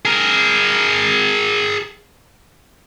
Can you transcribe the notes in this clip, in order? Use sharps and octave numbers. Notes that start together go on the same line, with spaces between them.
G#4 A#4